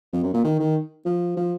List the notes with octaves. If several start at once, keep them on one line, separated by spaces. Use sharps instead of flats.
F2
F#2
A#2
D#3
D#3
F3
F3